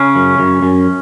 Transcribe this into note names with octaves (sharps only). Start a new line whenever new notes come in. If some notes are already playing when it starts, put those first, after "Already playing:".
Already playing: C#3 C#4
F#2
F#2
F#2